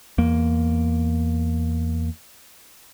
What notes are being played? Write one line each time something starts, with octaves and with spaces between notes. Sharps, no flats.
E2 A#3